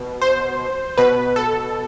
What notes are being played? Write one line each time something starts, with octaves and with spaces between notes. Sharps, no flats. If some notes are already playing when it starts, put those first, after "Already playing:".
Already playing: B2
C5
B2 B4
A4